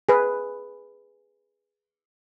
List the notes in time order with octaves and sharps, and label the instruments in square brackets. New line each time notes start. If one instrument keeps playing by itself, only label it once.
[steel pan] G#4 B4